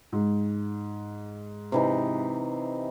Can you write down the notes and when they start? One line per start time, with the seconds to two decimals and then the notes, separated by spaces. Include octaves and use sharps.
0.12 G#2
1.72 C3 E3 D#4